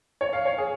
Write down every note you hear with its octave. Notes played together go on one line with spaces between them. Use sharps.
C#5
F5
C#5
G#4